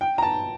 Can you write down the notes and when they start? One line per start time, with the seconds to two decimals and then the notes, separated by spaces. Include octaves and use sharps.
0.01 G5
0.18 A#5
0.23 A5